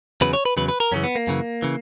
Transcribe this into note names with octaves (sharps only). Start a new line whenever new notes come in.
E2 C#3 F#3 B4
C#5
B4
E2 C#3 F#3 B4
B4
A#4
F#2 C#3 E3 C#4
B3
A#3
F#2 C#3 E3
C#3 E3